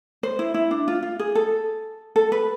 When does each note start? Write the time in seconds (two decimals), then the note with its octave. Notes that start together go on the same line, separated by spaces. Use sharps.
0.23 C5
0.39 E4
0.54 E4
0.71 D4
0.88 F4
1.03 F4
1.19 G#4
1.35 A4
2.16 A4
2.32 B4